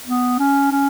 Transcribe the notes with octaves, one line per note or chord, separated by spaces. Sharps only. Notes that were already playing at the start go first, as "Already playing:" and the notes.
B3
C#4
C#4